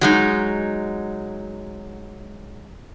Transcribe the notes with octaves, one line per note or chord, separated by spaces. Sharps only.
F#3 G#3 D#4